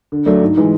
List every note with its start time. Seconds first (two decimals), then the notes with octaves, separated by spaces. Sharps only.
0.12 D3
0.26 F#3 A3 D4
0.42 G#2
0.57 E3 G#3